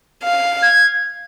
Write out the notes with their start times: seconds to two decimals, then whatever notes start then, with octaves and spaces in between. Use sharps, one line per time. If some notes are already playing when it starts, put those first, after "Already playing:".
0.23 F5
0.62 G#6